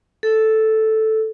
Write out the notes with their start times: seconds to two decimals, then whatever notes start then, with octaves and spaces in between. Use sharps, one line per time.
0.23 A4